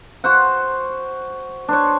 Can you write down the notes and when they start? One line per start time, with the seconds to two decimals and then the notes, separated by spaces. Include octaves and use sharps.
0.24 F#4 C5 F#5
1.68 D4 C5 C#5